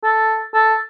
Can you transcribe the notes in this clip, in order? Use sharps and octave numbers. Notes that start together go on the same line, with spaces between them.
A4
A4